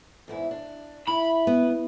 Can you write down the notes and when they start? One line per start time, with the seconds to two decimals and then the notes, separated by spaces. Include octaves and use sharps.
0.28 E2 G#2 E4
0.51 D4
1.07 E4 B5
1.47 B3